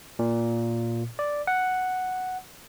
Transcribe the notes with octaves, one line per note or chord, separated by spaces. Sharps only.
A#2
D5
F#5